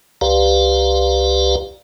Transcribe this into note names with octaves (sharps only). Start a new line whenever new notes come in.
C2 G4 B4 D5 F5 A#5